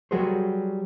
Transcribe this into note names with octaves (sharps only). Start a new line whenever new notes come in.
F#3 G3 F#4 G#4 A#4 C5